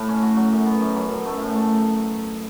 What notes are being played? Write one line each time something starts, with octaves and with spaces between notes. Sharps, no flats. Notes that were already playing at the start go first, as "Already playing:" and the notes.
Already playing: A2 A3 E4
C#4
F#4
F#3
F#2
B3
F#2
F#3
F#2
A3
A2
A3